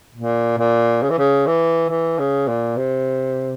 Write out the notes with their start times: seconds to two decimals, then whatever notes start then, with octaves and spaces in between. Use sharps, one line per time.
0.15 A#2
0.58 A#2
1.02 C#3
1.10 E3
1.18 C#3
1.46 E3
1.89 E3
2.18 C#3
2.48 A#2
2.77 C3